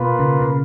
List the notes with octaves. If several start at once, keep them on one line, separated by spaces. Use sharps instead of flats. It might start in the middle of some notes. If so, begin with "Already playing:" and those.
Already playing: B2 A#3 F4 B4
C#3
C#3